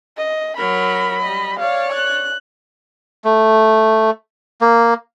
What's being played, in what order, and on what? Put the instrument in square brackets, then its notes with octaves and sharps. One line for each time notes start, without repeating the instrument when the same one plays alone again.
[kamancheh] D#5
[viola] F#3 A#4 [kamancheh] B5
[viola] G3 D#5
[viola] C#5 D5 [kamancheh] F5
[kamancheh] F#6
[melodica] A3
A#3